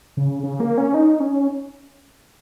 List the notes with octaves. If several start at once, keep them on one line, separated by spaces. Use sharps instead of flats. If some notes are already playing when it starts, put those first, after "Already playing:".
C#3
C#3
A#3
C#4
D#4
C#4